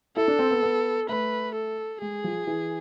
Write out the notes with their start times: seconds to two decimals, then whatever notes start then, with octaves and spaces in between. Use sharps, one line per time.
0.17 E4 A4
0.28 D4
0.39 C4
0.51 B3
0.63 B3
1.09 A3 B4
1.55 A4
2.01 G#3 G#4
2.24 F3
2.47 E3